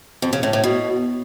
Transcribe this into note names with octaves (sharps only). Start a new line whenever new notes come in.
F2
C#3
A2
A2
B2